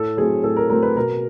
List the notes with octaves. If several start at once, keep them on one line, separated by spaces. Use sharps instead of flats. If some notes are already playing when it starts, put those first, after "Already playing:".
Already playing: A2 A4
F#3 A3 C4 G#4
A2 A4
A#4
F#3 A3 C4 A#4
B4
B2 A#4